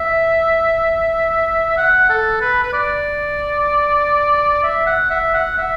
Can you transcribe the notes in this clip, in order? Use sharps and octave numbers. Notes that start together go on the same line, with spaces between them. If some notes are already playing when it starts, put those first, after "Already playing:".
Already playing: E5
F#5
A4
B4
B4
D5
E5
F#5
E5
F#5
E5